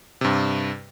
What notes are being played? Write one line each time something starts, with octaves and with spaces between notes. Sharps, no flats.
G2 C3